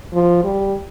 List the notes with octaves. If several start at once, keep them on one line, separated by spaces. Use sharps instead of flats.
F3
G3